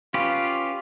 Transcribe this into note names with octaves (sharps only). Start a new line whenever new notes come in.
C#4 F4 G4 B4